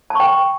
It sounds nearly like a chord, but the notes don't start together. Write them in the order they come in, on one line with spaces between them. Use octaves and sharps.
A5 C#6 G5